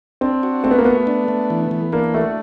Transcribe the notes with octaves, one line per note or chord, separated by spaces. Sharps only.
C4 D4
F#4
A3 C4
B3
A#3
A3 B3
D4
A3
E3
E3
A#3 D4
A3 F#4